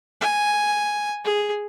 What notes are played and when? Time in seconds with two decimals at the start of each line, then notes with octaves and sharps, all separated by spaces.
0.21 G#5
1.24 G#4